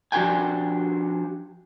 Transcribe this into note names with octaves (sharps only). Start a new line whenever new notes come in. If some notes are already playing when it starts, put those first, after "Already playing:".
F3 D4 F#4 G4 G5 G#5